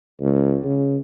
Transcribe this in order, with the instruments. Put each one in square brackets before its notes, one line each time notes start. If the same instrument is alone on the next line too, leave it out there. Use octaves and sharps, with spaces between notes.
[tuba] C#2
C#3